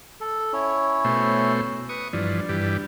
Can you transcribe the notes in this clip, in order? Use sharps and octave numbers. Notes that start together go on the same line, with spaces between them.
A4
C#4 E4 C#5
B2 A3 C5
B4 C#6 D#6
G2 E3 F3 D5
G2 E3 G4